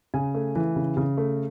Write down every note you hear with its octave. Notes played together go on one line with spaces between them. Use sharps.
C#3 G#5
A3
E3
C#3
C#3
A3